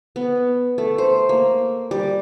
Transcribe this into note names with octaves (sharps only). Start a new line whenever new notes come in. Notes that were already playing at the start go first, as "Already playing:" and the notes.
B3
A3
C5
A#3
G3